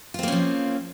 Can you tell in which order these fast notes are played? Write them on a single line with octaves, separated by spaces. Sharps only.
F4 C4 A#3 C#4 F3